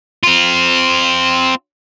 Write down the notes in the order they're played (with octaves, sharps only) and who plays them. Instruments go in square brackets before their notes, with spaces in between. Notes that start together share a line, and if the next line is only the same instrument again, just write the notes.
[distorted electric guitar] C4 F4